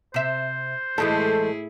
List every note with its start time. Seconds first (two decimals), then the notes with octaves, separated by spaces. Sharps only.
0.14 C3 C5 E5
0.98 A2 E3 G#3 A3 E4 G#4 A4